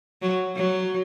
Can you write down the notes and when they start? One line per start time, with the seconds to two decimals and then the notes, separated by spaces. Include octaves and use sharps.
0.22 F#3
0.56 F#3